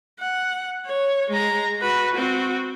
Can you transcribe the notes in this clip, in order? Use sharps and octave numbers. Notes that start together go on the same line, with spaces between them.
F#5
C#5
G#3 A#5
F#4 B4
C4 F#4